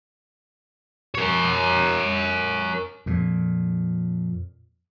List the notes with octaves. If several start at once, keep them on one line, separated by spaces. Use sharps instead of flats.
A#4 C#5
F2 A#2